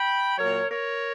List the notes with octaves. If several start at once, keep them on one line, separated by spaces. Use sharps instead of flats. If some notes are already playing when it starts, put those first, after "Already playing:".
Already playing: G5 B5
A#2 F#3 A#4 C#5
A#4 C#5